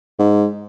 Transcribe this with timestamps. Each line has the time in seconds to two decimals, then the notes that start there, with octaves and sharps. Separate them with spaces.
0.19 G#2